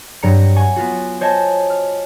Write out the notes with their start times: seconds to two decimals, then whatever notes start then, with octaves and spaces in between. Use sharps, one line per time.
0.22 G2 F#3 C4 A#5 C#7
0.56 F#5 G#5 C#6
0.76 B3 F4 F#4
1.21 C5 C#5 D#5 G#5 A5
1.70 F6